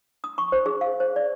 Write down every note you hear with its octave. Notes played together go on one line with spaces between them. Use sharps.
D#6
C#6
C5
G#4
F5
C5
D5